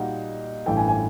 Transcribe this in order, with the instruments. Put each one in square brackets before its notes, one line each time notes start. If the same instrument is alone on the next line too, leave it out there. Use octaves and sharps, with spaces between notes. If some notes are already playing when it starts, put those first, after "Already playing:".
Already playing: [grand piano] A#2 G3 A#3 D#4 F#4 [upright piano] F#5
[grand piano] A1 G2 E3 A3 [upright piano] G5
[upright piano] G#5
G#5